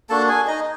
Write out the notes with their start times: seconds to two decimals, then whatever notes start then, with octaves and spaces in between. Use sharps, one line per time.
0.10 A#3 D4 F#4 A4 A5
0.28 G#4 G#5
0.47 D#4 D#5